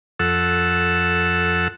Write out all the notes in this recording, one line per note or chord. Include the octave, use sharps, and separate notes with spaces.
F2 A4 F#5 E6